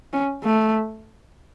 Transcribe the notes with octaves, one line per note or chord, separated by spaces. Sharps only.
C#4
A3